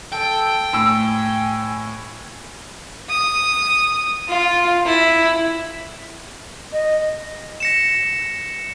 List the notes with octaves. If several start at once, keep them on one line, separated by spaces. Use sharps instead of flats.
A4 G5
A2 G#5 E6
D#6
F4
E4
D#5
A#6 C#7 E7